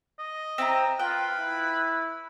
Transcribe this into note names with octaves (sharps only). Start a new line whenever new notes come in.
D#5
C4 E4 A#5
F4 B4 G5
E4